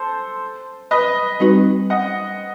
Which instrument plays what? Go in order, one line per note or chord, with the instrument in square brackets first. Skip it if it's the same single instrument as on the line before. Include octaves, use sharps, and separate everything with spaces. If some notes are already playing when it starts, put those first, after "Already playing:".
Already playing: [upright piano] A4 C5
B4 D#5
[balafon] G3 C4 D#4 F#4 B4
[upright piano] D#5 F#5